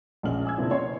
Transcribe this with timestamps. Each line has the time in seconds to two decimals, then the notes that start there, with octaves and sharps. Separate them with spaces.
0.23 A#1 A#2 G#3 C#4 F6 F#7
0.45 G#5 E6 G#6
0.57 C#3 F3 A#3 C4 D4 E4
0.70 B2 C#5 C6